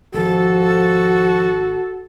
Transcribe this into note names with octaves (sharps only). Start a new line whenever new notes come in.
G#1 D#3 F3 F#4 A4